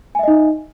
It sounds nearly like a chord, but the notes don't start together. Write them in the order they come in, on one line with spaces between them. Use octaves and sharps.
G#5 E5 D#5 D#4